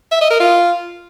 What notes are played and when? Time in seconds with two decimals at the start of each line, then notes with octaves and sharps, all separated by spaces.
0.12 E5
0.21 D#5
0.30 A#4
0.40 F4